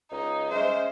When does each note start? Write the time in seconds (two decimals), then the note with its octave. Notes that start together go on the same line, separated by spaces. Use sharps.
0.12 C#2 D#4
0.51 G#3 C#4 C5 E5